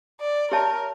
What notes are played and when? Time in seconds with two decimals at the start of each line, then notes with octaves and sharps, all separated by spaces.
0.21 D5
0.51 G4 A#4 C#5 E5 A5